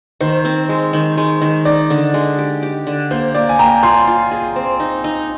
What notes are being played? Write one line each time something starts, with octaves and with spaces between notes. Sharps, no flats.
D#3 C5
C4
G#3
D#3
G#3
D#3
D#4 D5
D3
G#3
G4
G4
D3
A#3 C5
A#3 D5
G#5
A#3 G5 A#5
F4 G#5 C6
F4
G#4
C4
D#4
D#4